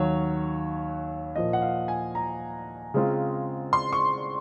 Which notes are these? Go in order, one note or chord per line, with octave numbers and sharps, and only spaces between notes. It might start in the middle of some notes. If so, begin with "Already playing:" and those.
Already playing: D#2 D#3 F#3 C#5
A#2 F3 A#3 D#5
F#5
F5
G#5
A#5
C#3 G#3 C4 F4
C6
C#6